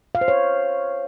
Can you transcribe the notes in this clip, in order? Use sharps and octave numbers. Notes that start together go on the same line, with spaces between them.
F5
C5
C#5